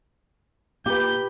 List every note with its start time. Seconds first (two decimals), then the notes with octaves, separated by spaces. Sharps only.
0.86 A#2 G4 B4 G6